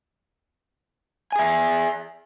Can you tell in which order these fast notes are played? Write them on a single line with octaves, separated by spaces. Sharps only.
G#5 G#4 E5